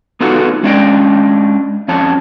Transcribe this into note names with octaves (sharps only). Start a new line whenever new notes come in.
B3 D#4 F4 F#4 A4 B4
G#3 C#4 D4 D5 D#5 G5
F2 C#4 A5